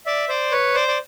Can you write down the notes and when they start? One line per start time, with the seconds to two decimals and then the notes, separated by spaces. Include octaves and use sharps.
0.06 D5 E5
0.29 C5 D5
0.52 B4 C#5
0.74 C5 D5
0.88 D5